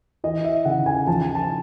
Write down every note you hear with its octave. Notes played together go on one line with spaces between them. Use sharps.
E3 D#5
E5
C#3 F#5
G#5
F3 A5
G#5
A5